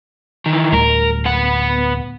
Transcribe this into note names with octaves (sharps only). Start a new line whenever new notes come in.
D#3 E3
D1 D2 G3 A#4
B3 F#5